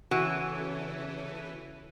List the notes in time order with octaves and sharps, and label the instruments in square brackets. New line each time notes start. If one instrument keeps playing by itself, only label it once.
[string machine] C#3 A4 C#5 [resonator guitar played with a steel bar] E3 [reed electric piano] F#4